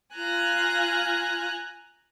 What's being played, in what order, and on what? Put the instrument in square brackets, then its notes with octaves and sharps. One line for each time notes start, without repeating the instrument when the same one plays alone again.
[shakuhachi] F4 [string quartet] G#5 A#5 F#6